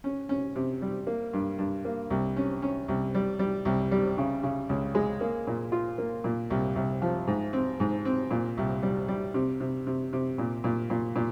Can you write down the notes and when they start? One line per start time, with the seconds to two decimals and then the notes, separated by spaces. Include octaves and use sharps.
0.04 C#4
0.29 C#4
0.56 C3
0.82 G3
1.07 A#3
1.33 G2
1.59 G2
1.85 A#3
2.10 C2
2.37 C#4
2.62 C#4
2.88 C2
3.15 G3
3.39 G3
3.65 C2
3.92 G3
4.18 C#3
4.43 C#3
4.69 C#2
4.95 G#3
5.21 A#3
5.47 A#2
5.72 F4
5.98 A#3
6.24 A#2
6.50 C2
6.76 C2
7.02 F3
7.27 G#2
7.53 C4
7.80 G#2
8.05 C4
8.31 A#2
8.58 C2
8.83 G3
9.08 G3
9.34 C3
9.60 C3
9.87 C3
10.13 C3
10.38 A#2
10.64 A#2
10.90 A#2
11.16 A#2